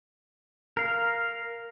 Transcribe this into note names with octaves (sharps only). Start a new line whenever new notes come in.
A#4 F5